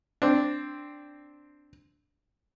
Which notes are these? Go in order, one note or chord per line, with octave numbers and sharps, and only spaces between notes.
C4 D4